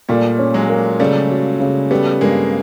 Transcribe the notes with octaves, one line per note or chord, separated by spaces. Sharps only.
A#2 G3 A3
C#4
F#3 G#3
A#3
C#3 G3 A3
F#3
C#3
G3 A3 B3
G2 G#3 A#3